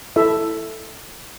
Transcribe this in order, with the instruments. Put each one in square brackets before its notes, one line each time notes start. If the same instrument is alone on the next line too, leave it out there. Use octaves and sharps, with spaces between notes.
[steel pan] E4 A4 E5